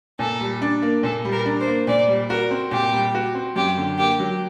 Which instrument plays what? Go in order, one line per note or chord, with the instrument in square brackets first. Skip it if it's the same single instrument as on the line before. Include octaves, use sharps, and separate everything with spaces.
[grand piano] A#2 [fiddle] A4
[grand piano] G3
D4
A#3
[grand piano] A#2 [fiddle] A4
[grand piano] G3
[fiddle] A#4
[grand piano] D4
[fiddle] C5
[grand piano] A#3
[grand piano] A#2 [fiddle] D5
[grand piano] G3
[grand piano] F#4 [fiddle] A#4
[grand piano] C4
[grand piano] A#2 [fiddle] G4
[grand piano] G3
F#4
C4
[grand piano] F#2 [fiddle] G4
[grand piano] D3
[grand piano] A#3 [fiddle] G4
[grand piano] F#3